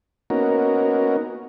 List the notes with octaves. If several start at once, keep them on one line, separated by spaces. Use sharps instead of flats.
A#3 B3 C#4 D#4 F#4 A#4